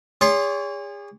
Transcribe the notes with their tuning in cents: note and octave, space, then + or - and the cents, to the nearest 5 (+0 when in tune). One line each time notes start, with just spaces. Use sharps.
G#4 -35 C#5 +40 C6 +10